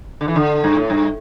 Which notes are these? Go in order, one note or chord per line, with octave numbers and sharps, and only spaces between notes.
D3
E3
D3
G2
A2
G2